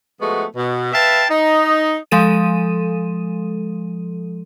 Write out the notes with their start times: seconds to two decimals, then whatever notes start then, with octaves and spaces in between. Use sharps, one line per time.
0.20 F3 G#3 A3 B3 F#4
0.56 B2
0.93 B4 E5 F5 G5 A5
1.30 D#4
2.11 F3 G#3 A4 D#7